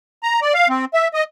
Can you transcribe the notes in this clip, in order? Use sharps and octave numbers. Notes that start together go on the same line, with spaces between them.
A#5
D5
F5
C4
E5
D#5